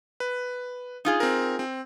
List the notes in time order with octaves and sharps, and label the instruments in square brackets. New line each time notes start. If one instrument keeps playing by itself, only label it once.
[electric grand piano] B4
[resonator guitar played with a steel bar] D#4 F4 G#4
[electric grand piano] C4 A#4
C4